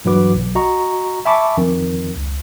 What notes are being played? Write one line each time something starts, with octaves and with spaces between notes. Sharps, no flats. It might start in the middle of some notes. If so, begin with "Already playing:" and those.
G2 E3 F#3 F#4 B4 D6
B1
F#4 D#5 A#5 C#6
E5 G#5 A5 B5 C#6 D6
F2 D#3
C#2